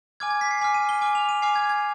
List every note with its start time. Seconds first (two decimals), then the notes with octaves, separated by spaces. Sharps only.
0.20 G#5 D6 F6 G#6
0.30 G#6
0.41 B6
0.51 C7
0.61 G#5 D6 F6 C7
0.74 D#7
0.89 G7
1.01 G#5 D6 F6
1.15 F7
1.29 D#7
1.42 G#5 D6 F6 C7
1.56 G#6
1.69 G#6